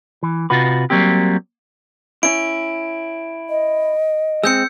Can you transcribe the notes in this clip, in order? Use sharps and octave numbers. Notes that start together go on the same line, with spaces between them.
E3
C3 F4 F#4 B4
F#3 G3 A#3 C4 G4
C#4 E4 D7
D#5
G#3 C4 E6 G6 C#7